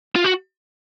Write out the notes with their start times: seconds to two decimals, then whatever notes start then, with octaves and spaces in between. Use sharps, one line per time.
0.16 F4
0.24 F#4